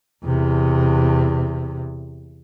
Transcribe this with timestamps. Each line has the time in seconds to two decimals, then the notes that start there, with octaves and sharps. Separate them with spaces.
0.24 E2 C3